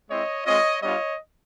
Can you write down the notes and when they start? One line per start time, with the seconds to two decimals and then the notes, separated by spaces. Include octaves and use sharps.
0.09 G#3 C4 E4 C#5 D#5
0.45 G#3 C4 F4 C#5 D#5
0.82 G3 B3 D4 F4 C#5 D#5